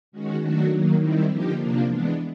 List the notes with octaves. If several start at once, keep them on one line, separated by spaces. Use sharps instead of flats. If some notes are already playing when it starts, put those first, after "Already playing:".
D#3 G#3 C#4 F#4
D#3 F#3 A3 D4 F#4
D#3 F#3 A#3
D#3 G3 C4 E4
D3 F3 A#3 D#4 G4
C3 F3 A#3 D4
E3 G#3 B3 D4